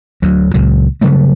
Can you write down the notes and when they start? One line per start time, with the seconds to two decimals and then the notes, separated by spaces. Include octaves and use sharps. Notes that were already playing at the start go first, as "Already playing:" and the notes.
0.22 D2 F#3
0.54 C#2 A#2 F#3
1.01 C#3 F#3 G3 A3